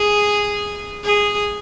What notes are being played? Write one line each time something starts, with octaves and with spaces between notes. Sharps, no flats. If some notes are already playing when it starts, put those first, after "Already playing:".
Already playing: G#4
G#4